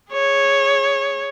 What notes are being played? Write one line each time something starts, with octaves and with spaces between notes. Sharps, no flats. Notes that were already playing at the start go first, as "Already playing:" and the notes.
G#4 C#5